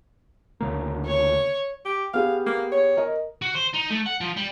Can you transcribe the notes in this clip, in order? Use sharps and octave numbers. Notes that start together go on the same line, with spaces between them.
D2 C#3 A#3
C#5
G4
B3 G4 G#4 F5
A#3
C#5
A#4 D#5
F#4
C5
D#4
A3
F#5
F3
G3